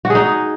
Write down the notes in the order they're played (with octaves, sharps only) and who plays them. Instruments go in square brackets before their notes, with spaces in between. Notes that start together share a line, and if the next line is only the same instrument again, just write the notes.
[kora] F#4
G#4
D#4